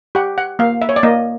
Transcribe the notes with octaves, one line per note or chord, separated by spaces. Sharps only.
G4 F#5
F#5
A#3 F5
E5
C#5
D5
A#3 D#5